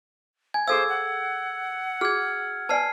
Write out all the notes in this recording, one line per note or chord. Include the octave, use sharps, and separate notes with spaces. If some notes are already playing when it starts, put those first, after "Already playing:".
G#5 G#6
G#4 A4 C5 F5 E6 G#6
F#5
F#4 G#4 F6 G#6
B4 D5 G#5 A5 F6 C7